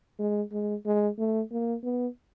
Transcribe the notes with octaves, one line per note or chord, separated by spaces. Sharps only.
G#3
G#3
G#3
A3
A#3
B3